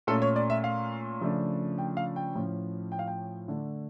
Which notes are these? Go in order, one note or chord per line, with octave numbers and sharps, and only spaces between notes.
A#2 A3 C#4 A4
C#5
D5
E5
F5
C#3 F3 A3 D4
G5
F5
G5
A2 F3 C#4
G5
F5
G5
D3 A3 D4